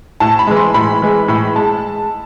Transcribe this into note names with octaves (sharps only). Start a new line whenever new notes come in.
A2 A5
B5
E3 G#3
C6
A2 B5
E3 G#3
A2 B5
G#3 A5